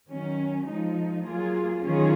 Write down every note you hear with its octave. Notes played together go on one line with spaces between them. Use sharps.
D#3 F#3 C#4
F3 G#3 D#4
F#3 A#3 F4 G#4
D#3 F#3 C#4 F4 G#4